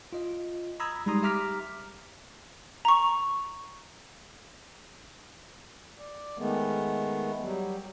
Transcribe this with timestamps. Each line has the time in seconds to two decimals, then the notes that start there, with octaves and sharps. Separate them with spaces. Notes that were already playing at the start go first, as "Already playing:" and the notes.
0.13 F4 D#5
0.80 A#5 B5 D#6 E6 G#6
1.06 G3 G#3 D#4 A#5 C6 D#6
1.23 G4 E5 A#5 D6 F6 B6
2.85 A#5 C#6
5.98 D5
6.38 D#3 G#3 A3 B3
7.42 F#3 G3